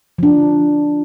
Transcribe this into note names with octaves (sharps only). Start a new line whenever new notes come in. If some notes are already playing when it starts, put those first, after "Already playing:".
F3 D4